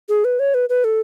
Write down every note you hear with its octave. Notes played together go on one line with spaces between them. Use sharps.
G#4
B4
C#5
B4
B4
A4